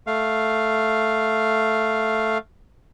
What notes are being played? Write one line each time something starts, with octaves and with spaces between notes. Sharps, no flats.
A3 F5